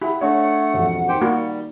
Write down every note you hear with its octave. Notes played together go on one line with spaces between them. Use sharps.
E4 G4 F#5
A3 D4 C#5 F#5 C#6
E1 F2
D#3 G4 C5 G5
G3 A#3 F#4